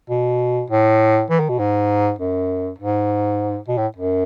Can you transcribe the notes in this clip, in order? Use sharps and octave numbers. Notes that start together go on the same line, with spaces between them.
B2
A2
E3
D#3
B2
G#2
F#2
G#2
B2
A2
F#2